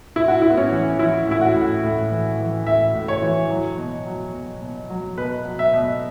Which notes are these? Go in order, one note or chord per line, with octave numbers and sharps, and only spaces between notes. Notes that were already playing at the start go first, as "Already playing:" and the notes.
A2 E4
F#4
A2 E4
B3
C#4
E3
E3 E4
A2 E4
F#4
A2
A2
E3
E3
A2 E5
A2
C#5
E3
F#3
B2
F#3
B2
B2
F#3
B2 B4
F#3
E5
B2